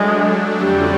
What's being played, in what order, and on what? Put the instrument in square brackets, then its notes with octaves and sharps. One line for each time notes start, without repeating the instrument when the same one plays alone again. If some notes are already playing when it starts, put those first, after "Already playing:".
Already playing: [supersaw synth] F#3 A3 D4 [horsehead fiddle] G#3
[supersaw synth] F2 D3 F#3 A3 C#4 [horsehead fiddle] G3